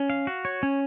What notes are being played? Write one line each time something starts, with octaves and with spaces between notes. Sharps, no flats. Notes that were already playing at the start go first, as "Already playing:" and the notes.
Already playing: C#4
F5
F#4
C#5
C#4